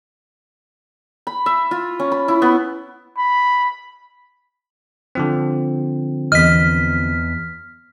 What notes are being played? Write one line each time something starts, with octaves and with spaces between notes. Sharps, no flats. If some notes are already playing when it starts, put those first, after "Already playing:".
B5
E5
F4
C#4
B5
E4
B3
B5
D3 F3 C4
E2 D#5 F6 B6